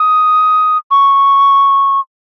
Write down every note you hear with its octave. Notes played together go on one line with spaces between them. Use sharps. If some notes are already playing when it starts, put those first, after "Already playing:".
Already playing: D#6
C#6